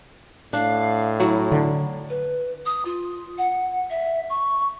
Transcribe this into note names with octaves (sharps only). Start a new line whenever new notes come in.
A2 D4 F5
F#3 E4
D3
B4
D#6
F4
F#5
E5
C#6